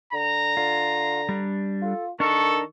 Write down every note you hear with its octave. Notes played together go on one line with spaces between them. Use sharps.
D3 A#5
D3 F4
G3 D4
F4 A4
D#3 D4 A4 A#4 C#6